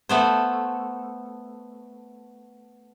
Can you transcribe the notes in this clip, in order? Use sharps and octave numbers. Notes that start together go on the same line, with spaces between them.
A3 B3 C5